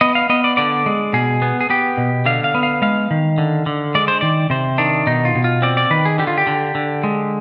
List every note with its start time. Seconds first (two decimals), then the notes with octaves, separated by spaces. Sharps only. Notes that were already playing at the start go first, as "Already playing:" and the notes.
0.01 B3 D#5
0.15 F5
0.29 B3 D#5
0.44 D5
0.57 D3 D5
0.86 G#3
1.13 B2 G#4
1.42 B3
1.61 G#4
1.70 B3 G4
1.97 B2
2.26 D3 F5
2.44 F5
2.55 B3
2.63 F5
2.82 G#3 F5
3.11 D#3
3.38 D3
3.66 D3
3.95 G#3 D5
4.08 C5
4.21 D#3 D5
4.50 C3 C5
4.78 D#3 D4
5.07 B2 D#4
5.25 F4
5.35 B2
5.44 F4
5.62 C4 D5
5.77 D5
5.90 D#3 B4
6.05 G#4
6.18 D3 G4
6.27 F4
6.38 G4
6.47 D3
6.75 D3
7.04 G#3